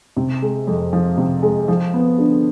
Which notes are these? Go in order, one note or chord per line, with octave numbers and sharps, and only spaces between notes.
C3
G#3
F2
F3
C3
G#3
F3
B3
D3